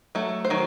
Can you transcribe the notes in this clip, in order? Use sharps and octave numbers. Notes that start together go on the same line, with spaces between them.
F#3 A3
C5
D#3 F#3